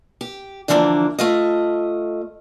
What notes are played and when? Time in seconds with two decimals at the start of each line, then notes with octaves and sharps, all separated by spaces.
0.21 G4
0.68 D3 E3 F3 G3 A#3 D4
1.19 A3 F4 D#5